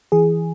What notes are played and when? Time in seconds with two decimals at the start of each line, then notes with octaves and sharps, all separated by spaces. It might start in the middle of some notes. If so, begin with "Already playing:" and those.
0.12 E3 G#4